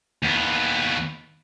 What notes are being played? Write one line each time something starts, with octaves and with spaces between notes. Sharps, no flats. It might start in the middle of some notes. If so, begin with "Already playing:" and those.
D#2 B3